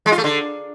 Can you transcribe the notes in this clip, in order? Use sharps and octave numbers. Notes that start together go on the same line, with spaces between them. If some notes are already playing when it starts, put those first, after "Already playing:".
G#3
F4
A3
D3